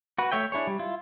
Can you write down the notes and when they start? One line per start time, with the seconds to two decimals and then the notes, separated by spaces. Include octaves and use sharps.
0.18 F#4 B4
0.32 A3 C#5 E5 G5
0.52 D4 E4 G#4 C#5
0.67 G3
0.79 E4 F4